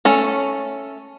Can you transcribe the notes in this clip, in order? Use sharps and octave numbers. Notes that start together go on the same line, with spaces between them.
A3 C#4 A4